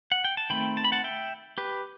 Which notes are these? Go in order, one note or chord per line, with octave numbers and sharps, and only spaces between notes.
F#5
G5
A5
D#3 A3 C4 G5 B5
A5
B5
F#5 A5
E5 G5
G4 B4